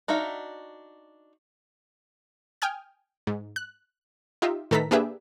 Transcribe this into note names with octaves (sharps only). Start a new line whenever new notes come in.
D4 D#4 F#4 E5 F5
G5 G#5 D#6 F6 G#6
G#2
F#6
D#4 F4 G4 E5
A2 D#3 A4 B4 A#5 B6
A#3 D4 G4 G#4 B4 E5